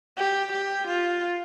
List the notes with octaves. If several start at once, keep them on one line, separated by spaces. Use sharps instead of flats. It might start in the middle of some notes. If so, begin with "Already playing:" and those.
G4
G4
F4